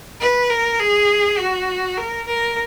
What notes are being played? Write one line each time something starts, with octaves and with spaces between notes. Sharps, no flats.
B4
A#4
G#4
F#4
A#4
A#4